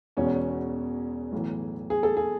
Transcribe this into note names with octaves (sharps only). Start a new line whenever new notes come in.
E1 E2 B2 C#4
B1 A2 E3
G#4
A4
G#4